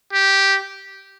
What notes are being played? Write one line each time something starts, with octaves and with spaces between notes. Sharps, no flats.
G4